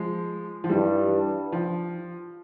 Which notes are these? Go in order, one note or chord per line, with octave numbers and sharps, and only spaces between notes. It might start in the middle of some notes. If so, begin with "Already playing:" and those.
Already playing: F3 G#3
F3
G2 E3 G3
F3